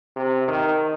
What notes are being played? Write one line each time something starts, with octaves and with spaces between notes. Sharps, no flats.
C3
D#3